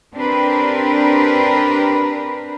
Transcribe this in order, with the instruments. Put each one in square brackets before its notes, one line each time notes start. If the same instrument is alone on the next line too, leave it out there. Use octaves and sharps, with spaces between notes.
[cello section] C4 D4 G4 A#4 B4